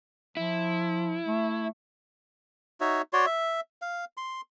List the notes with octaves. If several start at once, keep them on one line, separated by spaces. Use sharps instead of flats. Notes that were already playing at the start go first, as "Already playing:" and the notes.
F3 E4
A3
D#4 F#4 C#5 E5
F#4 C#5 D5 C6
E5
F5
C6